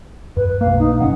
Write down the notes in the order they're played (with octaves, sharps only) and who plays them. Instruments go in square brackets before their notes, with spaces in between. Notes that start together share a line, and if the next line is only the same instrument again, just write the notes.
[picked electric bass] F#2 [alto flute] B4
[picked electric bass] B1 A#3 [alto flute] F5
[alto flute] D#4
[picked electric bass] F#1 F#2 C#4 [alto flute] F#5